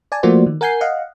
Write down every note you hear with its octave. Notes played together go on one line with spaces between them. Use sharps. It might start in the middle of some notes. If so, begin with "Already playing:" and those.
D5 G#5 A5
F3 A3 A#3 F#4 C5 D5
D#3
A#4 F#5 G#5 G6 C7
D#5 F5 F#5